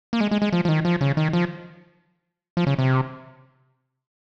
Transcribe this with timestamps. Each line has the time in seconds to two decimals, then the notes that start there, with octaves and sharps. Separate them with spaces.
0.13 A#3
0.21 G#3
0.31 G#3
0.42 G#3
0.53 F3
0.65 F3
0.69 D#3
0.85 F3
1.01 C#3
1.17 D#3
1.33 F3
2.57 F3
2.67 C#3
2.79 C3